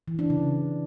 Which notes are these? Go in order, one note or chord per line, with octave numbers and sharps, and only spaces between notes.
E3
D4
C#3